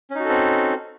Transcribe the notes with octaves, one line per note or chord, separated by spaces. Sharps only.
C4 C#4 D#4 F#4 A4